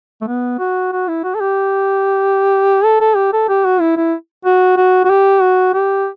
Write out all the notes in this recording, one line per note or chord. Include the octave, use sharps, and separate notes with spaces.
A3
B3
F#4
F#4
E4
F#4
A4
G4
A4
A4
G4
A4
G4
F#4
E4
E4
F#4
F#4
F#4
G4
F#4
G4